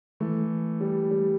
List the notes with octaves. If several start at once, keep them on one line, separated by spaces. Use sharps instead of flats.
E3 A3
G3
G3